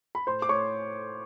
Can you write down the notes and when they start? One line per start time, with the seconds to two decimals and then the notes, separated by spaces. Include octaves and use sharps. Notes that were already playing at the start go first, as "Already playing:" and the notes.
0.15 B5
0.27 A2 C5 C6
0.42 D6
0.49 A2 C#5 C#6